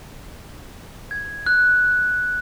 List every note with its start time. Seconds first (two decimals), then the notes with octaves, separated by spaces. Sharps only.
1.11 G#6
1.46 F#6